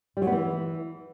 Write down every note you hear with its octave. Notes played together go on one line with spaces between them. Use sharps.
G3
F#3
B3
E3